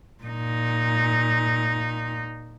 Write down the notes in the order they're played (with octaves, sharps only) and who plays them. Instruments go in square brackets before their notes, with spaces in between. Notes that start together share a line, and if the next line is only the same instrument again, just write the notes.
[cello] A#2 D#4